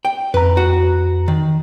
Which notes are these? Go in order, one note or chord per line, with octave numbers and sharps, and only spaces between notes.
G5
F2 B4 A#5
F#4
D#3